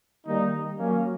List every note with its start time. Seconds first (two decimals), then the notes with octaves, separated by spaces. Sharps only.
0.26 D#3 G3 A#3 D#4
0.79 F#3 A#3 C#4